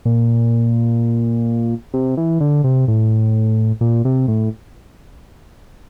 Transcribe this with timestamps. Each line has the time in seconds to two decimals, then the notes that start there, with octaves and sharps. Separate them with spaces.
0.05 A#2
1.94 C3
2.17 E3
2.40 D3
2.64 C3
2.88 A2
3.81 A#2
4.05 C3
4.28 A2